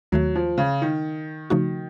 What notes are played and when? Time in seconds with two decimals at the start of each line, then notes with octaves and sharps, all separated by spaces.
0.12 D#2 D#3 F#3 A3
0.35 F3
0.58 C#3
0.82 D#3
1.50 C#3 F3 A3 D#4 F#4